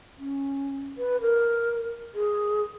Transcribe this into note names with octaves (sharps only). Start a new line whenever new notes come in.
C#4
B4
A#4
G#4